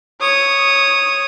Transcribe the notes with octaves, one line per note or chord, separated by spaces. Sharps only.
C#5 D#6